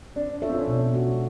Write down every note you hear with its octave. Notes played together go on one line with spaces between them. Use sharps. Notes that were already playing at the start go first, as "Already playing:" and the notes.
C4 D4
F4 A4 C#5 E5
C4
C#4
B2 D4
G#3 C#4 F#4 A4